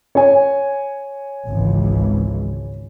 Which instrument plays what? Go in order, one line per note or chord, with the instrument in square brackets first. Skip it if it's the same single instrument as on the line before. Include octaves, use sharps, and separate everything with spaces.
[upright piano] C#5 G#5
[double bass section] G#1 C#2 E3